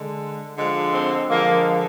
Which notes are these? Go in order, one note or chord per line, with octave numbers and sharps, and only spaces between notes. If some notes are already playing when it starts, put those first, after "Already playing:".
Already playing: D3 G#3
D3 F3 G#3
C4
D3 F3 G#3 A#3